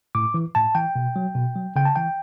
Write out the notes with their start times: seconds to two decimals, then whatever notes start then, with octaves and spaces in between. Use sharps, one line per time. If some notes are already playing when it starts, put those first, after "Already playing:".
0.15 A2 D6
0.34 E3
0.55 A2 A5
0.75 E3 G5
0.96 B2
1.16 F#3
1.35 B2
1.56 F#3
1.76 C#3 G5
1.85 A5
1.96 E3 G5